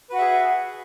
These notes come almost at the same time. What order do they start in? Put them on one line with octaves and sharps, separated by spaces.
B4 F#4 F#5 E5 G#4